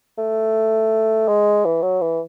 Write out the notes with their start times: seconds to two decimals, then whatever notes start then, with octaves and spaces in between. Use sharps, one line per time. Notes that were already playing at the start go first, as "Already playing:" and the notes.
0.18 A3
1.28 G#3
1.65 E3
1.82 F#3
2.01 E3